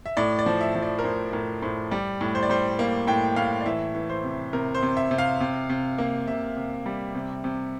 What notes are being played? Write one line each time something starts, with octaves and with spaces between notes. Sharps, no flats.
E5
A2 D5
D5
F3
E5
F3
D5
A#4
A2 C5
A2 A#4
A2 C5
G3 D5
A2
C5
D5
G3 C5
A#3
A2 G5
A2 F5
D5
E3 E5
E3
C5
C3
C3 A#4
C5
C3
E5
C3
F5
C3
C3
A#3
C3 E5
C3
G3
C3
C3